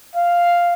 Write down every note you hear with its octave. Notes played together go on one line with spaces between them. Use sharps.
F5